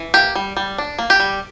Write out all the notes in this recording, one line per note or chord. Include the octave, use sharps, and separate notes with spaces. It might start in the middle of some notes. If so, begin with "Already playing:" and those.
Already playing: E3
A#3 G4
G3
G3
D4
A#3
G4
G3